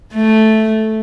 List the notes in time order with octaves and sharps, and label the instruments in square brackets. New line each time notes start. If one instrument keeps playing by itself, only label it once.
[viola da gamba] A3